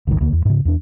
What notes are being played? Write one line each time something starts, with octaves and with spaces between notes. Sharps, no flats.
F#1 C#2 G2 D#3
D2 D3 A#3
E2
G#2 C#3
E2 D4